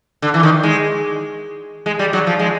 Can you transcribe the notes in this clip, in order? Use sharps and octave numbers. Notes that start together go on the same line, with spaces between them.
D3
E3
D#3
G#3
G#3
G3
F#3
F3
G#3